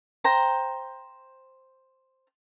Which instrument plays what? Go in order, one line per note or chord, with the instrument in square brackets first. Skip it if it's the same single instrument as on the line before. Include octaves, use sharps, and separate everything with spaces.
[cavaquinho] C5 G5 A#5